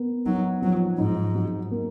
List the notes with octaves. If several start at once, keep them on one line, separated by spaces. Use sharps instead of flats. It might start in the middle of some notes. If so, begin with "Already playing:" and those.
Already playing: B3 A#4
F#3 D#4
F3 F#3
G#2 D#4
F#3
A#3